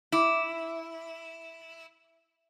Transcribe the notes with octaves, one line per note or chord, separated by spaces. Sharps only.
E4 D6